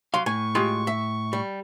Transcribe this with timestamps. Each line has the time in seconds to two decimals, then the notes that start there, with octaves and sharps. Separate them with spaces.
0.14 F#3 F5 C6
0.26 A2 G#5 C#6
0.55 G#3 F4 G4
0.87 E5
1.33 G3